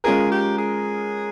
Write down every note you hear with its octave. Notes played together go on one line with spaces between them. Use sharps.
G#3 C#4 F4 G#4 A#4
G4
G#4